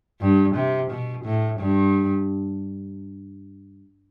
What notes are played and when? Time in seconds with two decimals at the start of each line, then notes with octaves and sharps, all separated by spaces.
0.21 G2
0.55 C3
0.90 B2
1.25 A2
1.60 G2